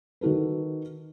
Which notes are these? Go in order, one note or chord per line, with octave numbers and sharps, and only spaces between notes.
D#3 D#4 F#4 A4 B4